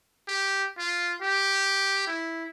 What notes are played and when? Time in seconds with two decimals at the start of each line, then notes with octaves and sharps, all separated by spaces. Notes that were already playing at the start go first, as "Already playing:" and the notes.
0.28 G4
0.78 F4
1.21 G4
2.07 E4